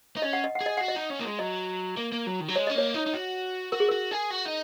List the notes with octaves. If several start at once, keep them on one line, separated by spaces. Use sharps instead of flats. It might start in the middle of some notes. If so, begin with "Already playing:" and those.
D#4
C#4 D#5
F#5
D#5
F#5
G#4
D#5
F#4 F#5
D#5
D#4
C#4
A#3
G#3
F#3 D#5
A#3
A#3
F#3
D#3
F#3
G#3 C#5
C#4 D#5
A#3 C#5
D#4
D#4
F#4
F#4 A#4
G#4
F#4 A#4
G#4
F#4
D#4